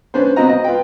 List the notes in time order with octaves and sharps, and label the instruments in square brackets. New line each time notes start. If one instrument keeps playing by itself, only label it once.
[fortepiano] C#4 D4 B4 C5
B3 C4 F#4 D#5 A#5
D#5
F4 B4 G5